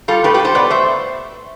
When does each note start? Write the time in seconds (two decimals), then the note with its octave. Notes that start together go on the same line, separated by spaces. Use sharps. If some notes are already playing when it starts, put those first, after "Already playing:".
0.08 G3 F4 A4
0.24 A2 G4 B4
0.34 G4 B4
0.39 G3
0.45 A4 C5
0.55 B2 B4 D5
0.70 A3 C5 E5